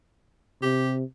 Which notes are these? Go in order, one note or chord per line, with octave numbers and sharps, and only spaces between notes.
C3 G4